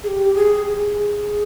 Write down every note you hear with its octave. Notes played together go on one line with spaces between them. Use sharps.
G#4
G4
G#4
G#4